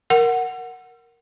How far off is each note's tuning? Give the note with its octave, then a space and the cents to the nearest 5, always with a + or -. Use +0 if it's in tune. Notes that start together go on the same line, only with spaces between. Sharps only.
A#4 +0 F#5 +0